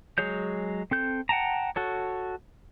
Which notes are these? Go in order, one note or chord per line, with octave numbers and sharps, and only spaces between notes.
F#3 G#3 G#4 C#5 G6
C4 A4 G6
F#5 G5 A5 A#5
F#4 A4 C#5